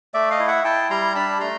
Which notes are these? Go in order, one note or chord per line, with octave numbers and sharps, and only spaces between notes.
A3 D5 E5
D#5 F5
E4
E5 F#5
E4 G5 A5
G3 A#5 C6
D4 A5 B5
A3 A#5 C6